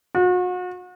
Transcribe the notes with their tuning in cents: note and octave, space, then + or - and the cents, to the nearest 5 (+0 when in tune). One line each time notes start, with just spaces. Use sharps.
F#4 -40